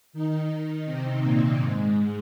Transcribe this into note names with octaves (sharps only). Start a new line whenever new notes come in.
D#3 D#4
D#3 D#4
C3 C4
A#2 A#3
G#2 G#3